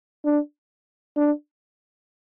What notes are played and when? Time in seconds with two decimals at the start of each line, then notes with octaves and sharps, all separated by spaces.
0.25 D4
1.17 D4